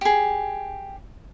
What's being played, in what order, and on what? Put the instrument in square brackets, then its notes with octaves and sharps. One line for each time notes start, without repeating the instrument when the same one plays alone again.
[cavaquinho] G4 G#4